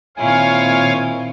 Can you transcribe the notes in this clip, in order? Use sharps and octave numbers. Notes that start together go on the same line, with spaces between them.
A#2 D#3 C4 E4 F4 C#5 F5 G#5